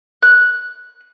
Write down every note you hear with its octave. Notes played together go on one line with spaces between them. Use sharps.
F#6